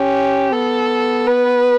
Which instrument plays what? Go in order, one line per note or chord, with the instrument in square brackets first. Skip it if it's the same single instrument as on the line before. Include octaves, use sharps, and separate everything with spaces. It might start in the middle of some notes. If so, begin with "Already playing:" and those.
Already playing: [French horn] C#4 [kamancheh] G4
[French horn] B3 [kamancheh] A4
[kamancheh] B4